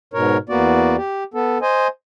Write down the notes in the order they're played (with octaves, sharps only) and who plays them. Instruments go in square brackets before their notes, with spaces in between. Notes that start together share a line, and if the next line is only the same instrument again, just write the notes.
[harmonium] G#2 B2 A#4 C#5
E2 A#3 B3 F#4 D5
G4
B3 A4
C5 D#5 G#5